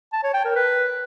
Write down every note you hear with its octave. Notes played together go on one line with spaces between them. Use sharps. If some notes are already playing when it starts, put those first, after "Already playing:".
A5
C#5
G5
A#4
B4